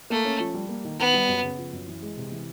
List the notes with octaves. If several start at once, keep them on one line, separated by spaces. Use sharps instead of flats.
A3 A#3
C#4
F3
G3
A#3
D#3
D#3 B3
G3
F#2
C#3
F3
F#2
E3
G#3
C3
E3